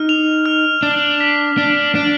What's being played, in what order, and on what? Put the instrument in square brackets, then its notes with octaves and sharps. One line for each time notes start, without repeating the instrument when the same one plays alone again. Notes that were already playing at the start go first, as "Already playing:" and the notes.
Already playing: [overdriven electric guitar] D#4 [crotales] F6
[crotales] F7
F6
[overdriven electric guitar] D4 [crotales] F6
[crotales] B6
[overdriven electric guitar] D4 [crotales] D7
[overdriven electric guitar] D4 [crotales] D7